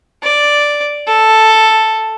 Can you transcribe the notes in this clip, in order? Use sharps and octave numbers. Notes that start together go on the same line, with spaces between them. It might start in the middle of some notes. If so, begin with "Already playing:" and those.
D5
A4